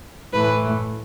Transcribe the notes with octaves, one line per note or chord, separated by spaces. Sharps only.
A2 E3 A3 B4